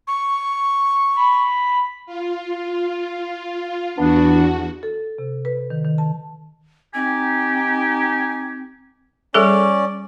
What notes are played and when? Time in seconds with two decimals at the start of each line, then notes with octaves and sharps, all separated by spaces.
0.07 C#6
1.16 B5
2.06 F4
3.98 E2 B3 D4 F#4
4.83 A4
5.18 C3
5.45 B4
5.70 D#3
5.84 D#3
5.98 A5
6.95 C4 D#4 G4 G#5
9.34 G3 C#4 G#4 A4 D5